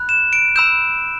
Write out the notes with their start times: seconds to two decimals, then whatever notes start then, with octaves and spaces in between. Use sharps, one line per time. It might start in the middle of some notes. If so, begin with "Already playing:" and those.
Already playing: B5 F#6
0.09 E7
0.33 D7
0.56 B5 E6 G6 E7